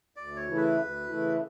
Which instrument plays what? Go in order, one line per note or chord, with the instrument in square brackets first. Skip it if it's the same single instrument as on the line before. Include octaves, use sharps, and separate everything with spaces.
[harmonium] D2 [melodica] D5
[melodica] C#5
[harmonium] C#3 E3 A3 E4
[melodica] B4
[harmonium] D2
C#3 E3 A3 E4